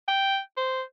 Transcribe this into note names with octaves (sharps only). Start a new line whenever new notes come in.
G5
C5